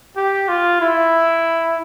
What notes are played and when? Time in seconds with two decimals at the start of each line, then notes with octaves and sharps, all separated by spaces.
0.17 G4
0.48 F4
0.81 E4